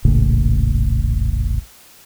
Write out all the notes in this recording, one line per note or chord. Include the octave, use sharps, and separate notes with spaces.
E1 A#1 A2 C#3